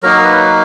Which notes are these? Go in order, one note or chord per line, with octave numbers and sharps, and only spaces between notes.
F#3 A#3 D#4 A#4
B4